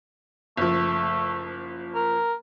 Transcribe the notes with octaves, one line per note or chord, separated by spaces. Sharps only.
F#1 F3 A3
A#4